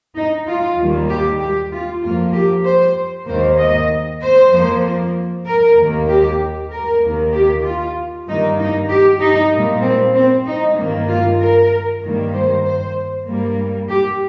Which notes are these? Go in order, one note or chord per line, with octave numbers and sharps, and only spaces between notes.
D#4
F4
D#2 D#3 G3 A#3
G4
G4
F4
F2 F3 A#3 F4
G4
C5
D#2 D#3 A#3 C5
D#5
C5
F2 F3 A#3
A#4
D#2 D#3 A#3
G4
A#4
D#2 D#3 A#3
G4
F4
G2 D#3 A#3 D#4
D#4
G4
D#4
A#2 G3 A#3
C4
C4
D#4
G2 D#3 A#3
F4
A#4
G2 D#3 G3 A#3
C5
C5
G2 G3 A#3
G4